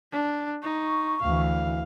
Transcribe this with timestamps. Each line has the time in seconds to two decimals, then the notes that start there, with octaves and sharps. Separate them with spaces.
0.12 D4
0.63 D#4 C#6
1.22 D2 E3 F5